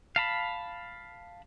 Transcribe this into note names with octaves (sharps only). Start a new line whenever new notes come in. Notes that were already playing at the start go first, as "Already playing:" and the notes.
F5 A5 B5